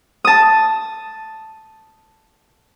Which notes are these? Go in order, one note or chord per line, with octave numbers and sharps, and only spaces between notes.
A5 D#6